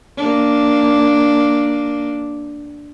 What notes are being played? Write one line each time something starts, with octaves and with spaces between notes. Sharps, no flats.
A#3 D4